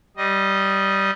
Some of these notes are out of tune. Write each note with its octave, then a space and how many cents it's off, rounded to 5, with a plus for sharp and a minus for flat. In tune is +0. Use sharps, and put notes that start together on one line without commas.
G3 -15 D#5 +0